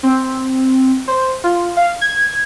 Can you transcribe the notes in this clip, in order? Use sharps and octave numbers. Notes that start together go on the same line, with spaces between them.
C4
C5
F4
F5
G#6